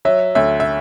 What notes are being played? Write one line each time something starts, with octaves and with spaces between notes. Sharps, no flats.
F#3 E5
D2 E5
E5